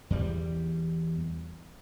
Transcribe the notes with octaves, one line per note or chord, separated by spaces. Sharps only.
E2 G3